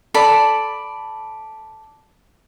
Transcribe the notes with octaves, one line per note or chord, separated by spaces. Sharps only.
A4 D5 B5